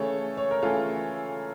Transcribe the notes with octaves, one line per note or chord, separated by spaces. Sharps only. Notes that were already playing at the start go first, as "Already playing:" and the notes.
Already playing: C#3 E3 A3 A4 C#5
C#5
A#4
C#3 E3 A3 F4 A4